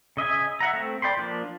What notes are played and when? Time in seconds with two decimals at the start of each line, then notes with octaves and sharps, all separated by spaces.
0.17 C#3 D#5 E5 G#5
0.60 E5 F#5 A#5
0.73 A3 C4
1.02 D5 G5 B5 C6
1.17 F3 A#3 D4